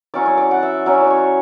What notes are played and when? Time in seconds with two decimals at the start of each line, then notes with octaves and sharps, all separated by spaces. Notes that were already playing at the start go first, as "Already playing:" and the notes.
0.14 F#3 C#4 E4 D5
0.26 C#5
0.37 D5
0.51 F#5
0.63 E5
0.86 F#3 C#4 E4 D5
1.04 D5
1.10 C#5